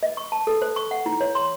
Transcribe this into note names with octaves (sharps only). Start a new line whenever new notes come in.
D#5
C#6
A5
A4
C5
C#6
F#5
E4
C#5
C6